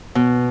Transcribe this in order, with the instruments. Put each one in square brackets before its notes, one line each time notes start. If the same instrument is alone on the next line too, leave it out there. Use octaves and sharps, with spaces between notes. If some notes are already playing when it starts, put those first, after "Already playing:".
[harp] B2